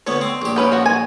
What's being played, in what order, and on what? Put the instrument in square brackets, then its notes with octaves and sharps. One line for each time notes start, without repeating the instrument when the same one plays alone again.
[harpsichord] D2 B3 [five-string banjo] C#5
[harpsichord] C4
A#1 G4
[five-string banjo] C#4 B4 G5
F3 F#4
G#5